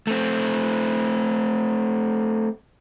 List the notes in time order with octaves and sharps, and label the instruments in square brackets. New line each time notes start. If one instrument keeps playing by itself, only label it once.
[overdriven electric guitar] A3 C4